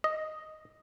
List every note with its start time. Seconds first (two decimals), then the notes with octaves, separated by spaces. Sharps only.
0.04 D#5